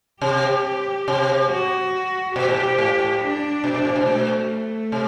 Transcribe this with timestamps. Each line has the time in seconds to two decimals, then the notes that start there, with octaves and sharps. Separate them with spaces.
0.21 C3 G4
1.08 C3
1.50 F#4
2.36 B2 G4
2.48 A2
2.60 B2
2.78 A2
2.99 A2
3.21 D4
3.64 B2
3.74 B2
3.85 A2
3.96 B2
4.01 C3
4.06 B2 A3
4.92 C3